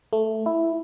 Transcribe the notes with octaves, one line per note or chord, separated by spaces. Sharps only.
A3
E4